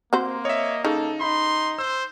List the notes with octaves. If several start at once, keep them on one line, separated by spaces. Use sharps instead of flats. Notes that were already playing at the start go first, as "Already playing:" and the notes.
A#3 C4 F#4 C5
C#5 D#5 E5
C#3 D#4 A4
D#4 B5 C6
C5 E6